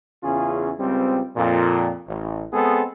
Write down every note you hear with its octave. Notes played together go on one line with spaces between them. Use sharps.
E2 C#3 C#4 F4 G#4
C#2 G3 C4
F2 A#2
A1
G#3 B3 C4 G#4 A4